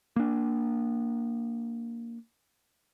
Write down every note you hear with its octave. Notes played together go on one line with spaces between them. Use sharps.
A#3 D4